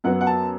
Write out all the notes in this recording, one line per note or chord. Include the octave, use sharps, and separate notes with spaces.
F#2 F#3 B3 F#5
F#5
A5